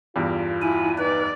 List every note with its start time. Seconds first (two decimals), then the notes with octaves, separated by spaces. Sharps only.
0.16 E2 G2 F4
0.62 E4 F#4 G#5
0.98 D#4 B4 D5